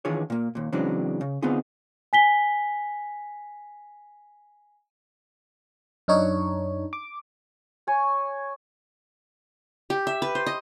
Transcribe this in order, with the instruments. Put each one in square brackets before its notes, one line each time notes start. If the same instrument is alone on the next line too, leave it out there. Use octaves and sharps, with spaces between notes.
[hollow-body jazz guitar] D#3 E3 D4 F4 G#4 C#5
A#2 A#3
D#2 A#2
C#3 E3 F#3 G#3 C4 D4
C#3
D3 B3 C4 D#4 F4 G#4
[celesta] G#5 B6 G7
[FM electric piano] F#2 D4 D#4 C#5
D6
[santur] C#5 G#5 C#6
[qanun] G4
E5
B4
C5
D#5